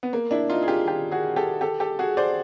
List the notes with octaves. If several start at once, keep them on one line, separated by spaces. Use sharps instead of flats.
B3
A#3
D4 E4
D#4 F4
G#4
F4 G4
F4 G4
F#4 G#4
G4 A4
G4 A4
G4 A4
F#4 G#4
C5 D5